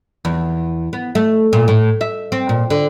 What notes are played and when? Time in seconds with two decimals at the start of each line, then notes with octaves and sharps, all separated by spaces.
0.25 E2
0.93 B3
1.15 A3
1.53 A#2
1.68 A2
2.01 E5
2.32 C4
2.49 A#2
2.70 D3